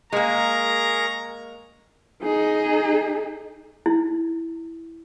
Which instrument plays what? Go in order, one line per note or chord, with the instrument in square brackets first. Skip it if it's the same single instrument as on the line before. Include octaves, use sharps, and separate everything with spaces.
[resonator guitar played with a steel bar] G#3 A#3 [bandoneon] G#4 A#4 C#6 [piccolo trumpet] A#5
[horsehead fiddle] D#4 G#4
[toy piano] E4